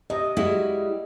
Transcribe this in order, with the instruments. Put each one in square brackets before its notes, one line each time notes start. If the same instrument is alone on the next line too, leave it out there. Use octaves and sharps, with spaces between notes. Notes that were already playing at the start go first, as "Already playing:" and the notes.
[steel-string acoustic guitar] C3 [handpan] D#5
[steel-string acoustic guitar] G3 [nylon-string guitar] G#3 E4 F#4